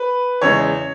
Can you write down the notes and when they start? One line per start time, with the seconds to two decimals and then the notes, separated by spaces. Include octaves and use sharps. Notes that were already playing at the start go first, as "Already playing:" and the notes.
Already playing: B4
0.42 E2 C#3 G#3 C#5